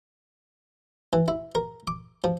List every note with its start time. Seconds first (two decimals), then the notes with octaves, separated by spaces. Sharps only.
1.13 E3
1.28 E4
1.55 A#4
1.87 D6
2.24 F3